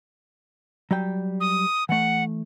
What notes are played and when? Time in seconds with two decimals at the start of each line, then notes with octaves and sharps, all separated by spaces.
0.91 F#3 G3 G5
1.40 D#6
1.89 E3 A3 F#5